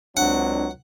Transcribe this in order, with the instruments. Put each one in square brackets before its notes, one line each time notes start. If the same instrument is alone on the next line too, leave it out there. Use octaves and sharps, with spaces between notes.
[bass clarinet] C#2 [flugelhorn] F#3 [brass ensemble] C4 D4 [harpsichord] F#5